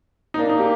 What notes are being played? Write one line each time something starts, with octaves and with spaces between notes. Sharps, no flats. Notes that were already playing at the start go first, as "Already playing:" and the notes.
D#4
A#3 D4
D#4
G4